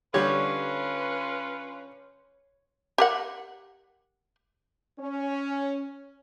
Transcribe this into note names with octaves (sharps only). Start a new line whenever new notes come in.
D3 G3 C#4 F4 B4 C#5
G4 A#4 F#5
C#4